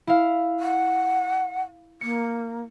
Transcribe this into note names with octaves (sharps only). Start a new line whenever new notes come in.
E4 F5
F#5
A#3 C#7